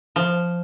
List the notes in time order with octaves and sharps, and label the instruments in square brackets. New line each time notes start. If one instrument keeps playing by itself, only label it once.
[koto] F3